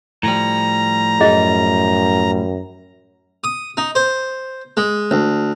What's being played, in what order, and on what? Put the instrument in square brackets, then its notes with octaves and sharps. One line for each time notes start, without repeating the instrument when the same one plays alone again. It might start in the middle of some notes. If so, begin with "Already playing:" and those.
[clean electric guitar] A2 F3 G3 [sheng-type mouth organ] A#5
[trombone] F#2 [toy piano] G#4 D#5
[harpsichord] D#6
D#4
C5
G#3
D2